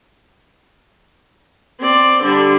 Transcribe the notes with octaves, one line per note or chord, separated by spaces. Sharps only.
C4 D5
D3 G3